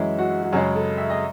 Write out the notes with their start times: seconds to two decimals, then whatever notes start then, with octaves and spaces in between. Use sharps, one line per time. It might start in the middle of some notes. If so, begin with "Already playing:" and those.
Already playing: F#2 E3 G#3 E5
0.19 F#4
0.43 F#4
0.53 F#2 C#3 G#3 G#4
0.76 A4
0.98 E5
1.10 D#5